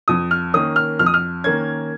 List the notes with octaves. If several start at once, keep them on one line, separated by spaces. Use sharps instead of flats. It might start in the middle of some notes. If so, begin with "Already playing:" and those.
F2 D#6
F6
D#3 A#3 C#4 D#6
F6
F2 F6
D#6
F6
D#3 A#3 C#4 G#6